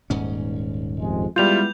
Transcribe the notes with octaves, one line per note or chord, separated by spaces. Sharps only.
D#1 G#2 C#4
F2 C3 G#3
G3 G#3 B3 E4 F4 G6 F7